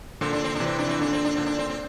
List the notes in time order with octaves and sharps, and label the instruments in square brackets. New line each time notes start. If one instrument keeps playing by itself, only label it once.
[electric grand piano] A#2 D3 [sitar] C4
[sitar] D4
C4
[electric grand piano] C3 E3 [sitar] D4
[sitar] C4
D4
[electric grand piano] E3 [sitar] C4
[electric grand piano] A#2 D3 [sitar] D4
[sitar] C4
D4
[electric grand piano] A#2 D3 [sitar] C4
[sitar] D4
C4
C4